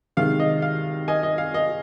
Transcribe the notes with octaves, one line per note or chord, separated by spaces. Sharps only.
C3 D#3 G#3 F5
D#5
F5
D#5 G#5
D#5
F5
D#5